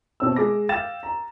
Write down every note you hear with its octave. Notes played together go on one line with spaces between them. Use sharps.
B2 C4 A5 E6
G#3 D6 A#6
F5 G5 D6 A6 E7
A#5